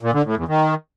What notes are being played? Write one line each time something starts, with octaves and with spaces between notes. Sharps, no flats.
A#2
D3
A2
E2
D#3